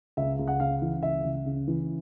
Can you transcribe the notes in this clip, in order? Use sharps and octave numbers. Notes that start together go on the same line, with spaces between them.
C#2 E5
C#2
F#5
C#3 F5
E3
C#2 E5
C#2
C#3
E3